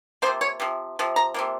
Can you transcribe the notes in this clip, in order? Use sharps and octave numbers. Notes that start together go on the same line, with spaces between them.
C3 F3 A#3 C5
C#5
C3 F3
C3 F3
A#5
C3 F3 A#3